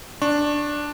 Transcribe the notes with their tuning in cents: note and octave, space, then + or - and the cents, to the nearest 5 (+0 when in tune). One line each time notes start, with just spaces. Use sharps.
D4 +0 C#6 -25